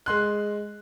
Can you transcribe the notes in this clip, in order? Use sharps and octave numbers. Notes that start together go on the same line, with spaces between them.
G#3 C6 F#6